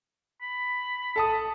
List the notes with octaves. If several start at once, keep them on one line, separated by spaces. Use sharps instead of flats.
B5
A4 A5 D#6